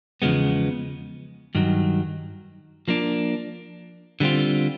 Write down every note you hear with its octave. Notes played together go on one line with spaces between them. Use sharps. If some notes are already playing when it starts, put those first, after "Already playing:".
E2 C#3 F3 G#3 B3
G2 D#3 F#3
F3 A#3 D4
D3 G3 C4 F4